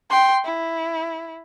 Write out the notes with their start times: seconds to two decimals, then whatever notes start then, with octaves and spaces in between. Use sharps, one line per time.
0.10 G5 C6
0.44 E4